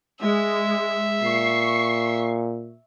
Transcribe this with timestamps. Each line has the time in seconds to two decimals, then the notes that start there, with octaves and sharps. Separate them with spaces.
0.21 G#3 E5
1.23 A#2 C#6 C7